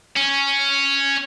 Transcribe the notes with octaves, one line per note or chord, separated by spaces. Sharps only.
C#4